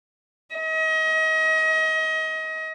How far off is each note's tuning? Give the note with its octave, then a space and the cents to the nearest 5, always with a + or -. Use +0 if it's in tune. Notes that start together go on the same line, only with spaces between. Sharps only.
D#5 +30